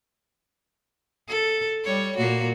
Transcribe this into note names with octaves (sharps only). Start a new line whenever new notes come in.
A4
G3 C#5
A#2 A#3 F#4